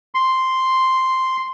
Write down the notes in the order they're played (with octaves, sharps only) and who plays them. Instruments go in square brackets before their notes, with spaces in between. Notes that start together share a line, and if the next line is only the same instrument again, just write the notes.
[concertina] C6